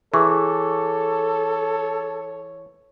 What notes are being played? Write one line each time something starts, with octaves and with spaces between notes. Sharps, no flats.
E3 G#4 A4 C#5 C#6 D6